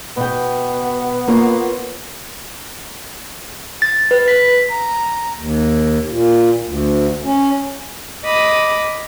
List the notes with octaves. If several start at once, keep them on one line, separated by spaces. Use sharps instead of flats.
B2 B3 G5
A#3 F4 C#5
A6
B4
B6
A#5
D#2
A#2
D2
C#4
D#5 B5 D6 D#6